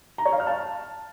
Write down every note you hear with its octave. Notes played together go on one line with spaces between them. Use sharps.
A#5
C#5
F5
F6
A5